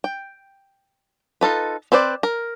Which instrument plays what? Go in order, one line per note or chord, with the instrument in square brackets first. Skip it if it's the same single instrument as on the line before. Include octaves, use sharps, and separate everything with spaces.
[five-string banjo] G5
D#4 F4 A4 B4
C4 B4 C5 D5
A#4